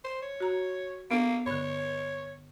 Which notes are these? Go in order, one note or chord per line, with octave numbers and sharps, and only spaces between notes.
C5
C#5
F#4 A#5
A#3 B3 D4 A4
G2 D3 C#5